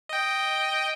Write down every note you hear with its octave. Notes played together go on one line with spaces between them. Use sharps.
D#5 G5